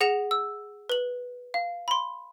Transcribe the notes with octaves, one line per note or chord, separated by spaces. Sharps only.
G#4 F#5 A#6 C#7 E7 F7
E6
B4 F#7
F5
B5 C6